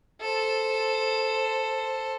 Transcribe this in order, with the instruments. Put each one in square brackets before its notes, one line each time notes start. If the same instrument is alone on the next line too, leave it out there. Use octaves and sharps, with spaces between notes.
[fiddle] A4 C5